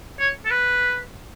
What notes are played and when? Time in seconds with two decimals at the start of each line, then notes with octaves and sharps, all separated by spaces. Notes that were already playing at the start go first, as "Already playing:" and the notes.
0.19 C#5
0.45 A4
0.50 B4